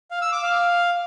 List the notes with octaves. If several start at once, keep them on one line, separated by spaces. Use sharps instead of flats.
F5
E6
D6
F5